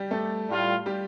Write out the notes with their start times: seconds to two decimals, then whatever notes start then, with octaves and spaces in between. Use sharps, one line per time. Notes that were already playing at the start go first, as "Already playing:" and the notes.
Already playing: G3 G4
0.11 A3 A4
0.49 A2 G3 F4
0.86 G3 G4